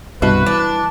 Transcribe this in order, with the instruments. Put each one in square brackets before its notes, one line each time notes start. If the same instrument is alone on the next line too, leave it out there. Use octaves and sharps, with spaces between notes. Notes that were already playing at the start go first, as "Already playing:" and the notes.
[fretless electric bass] C2 G2 B2 [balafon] G3 D#5 A5 [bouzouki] F#4 [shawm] B4
[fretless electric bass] E3 [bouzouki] D4